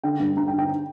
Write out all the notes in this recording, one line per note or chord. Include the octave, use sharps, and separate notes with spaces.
D3 G5
G2
G2 A#5
G5
D3
G5